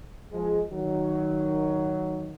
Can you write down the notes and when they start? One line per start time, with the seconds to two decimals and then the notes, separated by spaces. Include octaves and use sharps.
0.32 F3 G#3
0.70 D#3 F#3